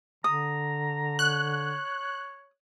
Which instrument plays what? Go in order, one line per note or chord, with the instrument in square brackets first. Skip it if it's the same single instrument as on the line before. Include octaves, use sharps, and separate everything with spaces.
[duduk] D3 [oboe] A#5 [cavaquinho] D#6
[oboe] C#5 [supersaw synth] F#6